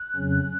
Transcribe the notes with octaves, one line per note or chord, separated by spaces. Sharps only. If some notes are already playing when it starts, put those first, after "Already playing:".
Already playing: F#6
F2 C#3 F#3 C#4